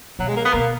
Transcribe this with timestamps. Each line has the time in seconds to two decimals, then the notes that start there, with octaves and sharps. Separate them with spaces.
0.19 B2 F#3
0.28 G#3
0.36 A#3
0.45 B3
0.53 B2 A#3